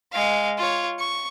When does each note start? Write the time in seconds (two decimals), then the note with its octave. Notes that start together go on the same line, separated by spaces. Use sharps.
0.12 G#3 F5
0.58 F4 C#5
0.99 C#6